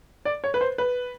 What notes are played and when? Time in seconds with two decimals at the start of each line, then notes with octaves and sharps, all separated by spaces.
0.25 D5
0.44 C#5
0.54 B4
0.61 C5
0.78 B4